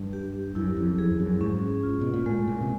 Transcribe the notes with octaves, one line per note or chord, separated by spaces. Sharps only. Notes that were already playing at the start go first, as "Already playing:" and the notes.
Already playing: G2
G4
F#2 E4
F2
F2 G#4
F2
F#2
G#2 C#4
F4
B2
A#2
A2 G#3
A#2
C3